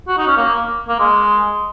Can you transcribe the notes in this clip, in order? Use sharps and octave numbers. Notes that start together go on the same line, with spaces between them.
F#4
D#4
C#4
A#3
A#3
G#3